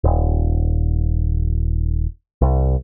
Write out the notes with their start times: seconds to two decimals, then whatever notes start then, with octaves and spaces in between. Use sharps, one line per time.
0.04 D#1
2.42 C2